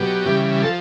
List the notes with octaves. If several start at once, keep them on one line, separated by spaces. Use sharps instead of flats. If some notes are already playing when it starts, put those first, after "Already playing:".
Already playing: B2 F#3 G4
C#3 E3 G3
F3 A4